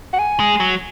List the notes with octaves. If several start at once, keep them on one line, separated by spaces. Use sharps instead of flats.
F#5
G#5
G#3
F#3